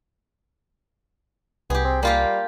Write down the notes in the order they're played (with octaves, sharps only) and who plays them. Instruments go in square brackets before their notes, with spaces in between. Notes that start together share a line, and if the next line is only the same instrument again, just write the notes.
[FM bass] C2 [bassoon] B3 [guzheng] G4 G#4
[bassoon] C4
[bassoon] G3 [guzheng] A#3 F4 G4